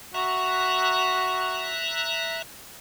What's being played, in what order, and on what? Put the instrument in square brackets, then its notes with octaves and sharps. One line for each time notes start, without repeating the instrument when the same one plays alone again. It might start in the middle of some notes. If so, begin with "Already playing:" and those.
[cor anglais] F#4 [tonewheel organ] E5 A#5 F#6